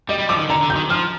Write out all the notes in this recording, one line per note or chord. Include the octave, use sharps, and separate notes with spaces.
G3 D#5
G3
F3 D6
D#3
D3 A#5
D3
G6
D#3
F3 F6